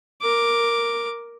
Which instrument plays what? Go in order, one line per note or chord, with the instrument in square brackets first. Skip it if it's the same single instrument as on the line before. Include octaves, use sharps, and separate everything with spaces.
[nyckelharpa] A#4 D6